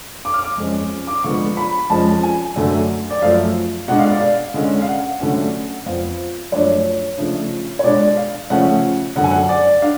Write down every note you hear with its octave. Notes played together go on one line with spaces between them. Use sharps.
D6
F6
D6
F2 F3 G#3 C#4
D6
D3 F3 G#3 B3 C#6
B5
F2 F3 G#3 C#4 A5
G#5
F#2 D3 F#3 A3
D5
F#2 F3 A3 F5
B2 G#3 D4 F#5
F5
D5
F5
D3 G#3 C#4
F5
F#5
D3 F#3 A3 C#4
F2 F3 B3 F5
F#2 F3 A3 D4 C#5
C#3 F3 A3 D4
C#5
B2 G#3 D4 D5
F5
C#3 F3 A3 C#4 F#5
F#2 D3 F#3 F#5
G#5
F#5
D5
D4 F5